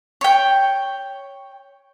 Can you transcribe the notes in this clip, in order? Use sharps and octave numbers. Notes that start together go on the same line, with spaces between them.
C#5 G5